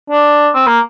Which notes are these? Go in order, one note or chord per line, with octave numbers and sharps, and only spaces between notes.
D4
C4
A#3